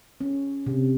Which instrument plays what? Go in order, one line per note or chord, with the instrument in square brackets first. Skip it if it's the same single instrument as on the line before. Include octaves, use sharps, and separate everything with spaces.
[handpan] C#4
C3